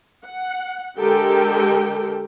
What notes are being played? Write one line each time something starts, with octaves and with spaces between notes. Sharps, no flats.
F#5
D3 G#3 G4 A4 A#4 G5